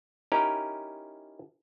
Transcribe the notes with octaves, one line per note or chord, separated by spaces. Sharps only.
C#4 D#4 E4 G4 A#4